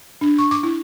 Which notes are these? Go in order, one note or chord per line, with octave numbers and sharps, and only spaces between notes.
D4
C#6
D6
E4